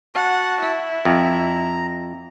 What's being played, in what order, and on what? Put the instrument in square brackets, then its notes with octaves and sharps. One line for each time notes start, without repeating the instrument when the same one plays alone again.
[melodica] F#4 A5 [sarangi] F#5
[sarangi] E4
[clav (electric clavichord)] F2 [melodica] A#5